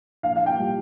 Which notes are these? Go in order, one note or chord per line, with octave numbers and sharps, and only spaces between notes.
A#1 F5
F5
G5
A#2 G3